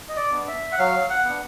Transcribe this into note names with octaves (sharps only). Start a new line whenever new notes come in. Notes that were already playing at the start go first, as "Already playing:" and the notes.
D#5
D5
B3 D4
E5
F#5
F#3 F5
F#5
B3 D4